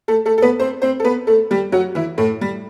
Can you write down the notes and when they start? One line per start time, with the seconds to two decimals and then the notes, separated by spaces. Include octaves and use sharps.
0.08 A3 A4
0.26 A3 A4
0.38 A4
0.42 B3 B4
0.60 C4 C5
0.82 C4 C5
1.00 A4
1.04 B3 B4
1.27 A3 A4
1.51 G3 G4
1.72 F#3 F#4
1.95 E3 E4
2.18 A2 A3
2.41 G3